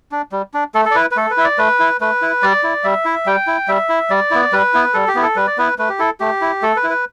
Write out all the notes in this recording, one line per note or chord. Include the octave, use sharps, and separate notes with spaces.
D4
G3
D4
A3 A4
A4
D5
E4 B4
B4
A3 A4
B4
E4 E5
D5
A3 B4
E4
A3 B4
E4
G3 D5
E4
G3 E5
E4
G3 G5
E4
G3 E5
E4
G3 D5
B3 E4
G3 B4
B3 E4
G3 A4
G4
B3 E4
A4
G3 B4
D5
B3 E4 B4
A3 B4
G4
E4 A4
A3 G4
E4
A3 A4
B4
E4
B4